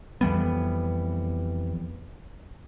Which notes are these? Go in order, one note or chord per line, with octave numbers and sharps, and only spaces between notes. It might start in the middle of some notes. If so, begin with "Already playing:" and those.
F2 E3 G3 B3